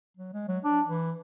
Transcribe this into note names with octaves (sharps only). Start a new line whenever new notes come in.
F#3
G#3
F#3
D4
E3